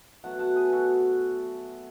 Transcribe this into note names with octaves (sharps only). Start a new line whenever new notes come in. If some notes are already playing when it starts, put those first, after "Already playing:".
B2 F#3 A3 F#5 A5
F#5 A5
G#4 B4
F#4 A4